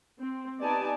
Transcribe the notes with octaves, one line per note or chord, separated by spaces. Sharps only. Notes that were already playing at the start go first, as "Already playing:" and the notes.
C4
B3 D#4 G4 D5 G#5 A5